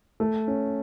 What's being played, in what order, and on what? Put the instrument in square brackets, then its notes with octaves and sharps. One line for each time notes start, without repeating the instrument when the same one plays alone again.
[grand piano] A3
C#4